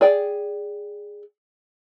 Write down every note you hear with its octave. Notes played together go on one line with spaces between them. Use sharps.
G#4 D5 G5